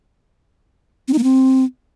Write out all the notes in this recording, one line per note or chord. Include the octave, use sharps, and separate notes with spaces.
C4
D#4
A#3
C4